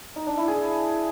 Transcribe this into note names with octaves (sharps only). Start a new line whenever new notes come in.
D#4
D4
E4
G#4